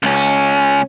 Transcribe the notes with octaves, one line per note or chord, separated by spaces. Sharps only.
C#2 C#4